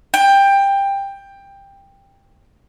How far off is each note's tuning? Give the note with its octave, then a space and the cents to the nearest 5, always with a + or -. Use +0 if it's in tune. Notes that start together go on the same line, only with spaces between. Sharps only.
G5 +15